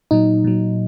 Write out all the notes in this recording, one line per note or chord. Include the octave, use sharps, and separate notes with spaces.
A#2 F#3 D#4
A#2 F#3